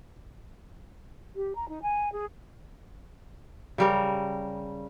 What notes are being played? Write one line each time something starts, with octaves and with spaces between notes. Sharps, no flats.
G4
A#5
D#4
G#5
G#4
C#3 G3 A#4